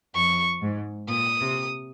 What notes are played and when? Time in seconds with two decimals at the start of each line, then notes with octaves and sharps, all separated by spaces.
0.15 F2 C#6
0.62 G#2
1.09 A#2 D#6
1.40 C3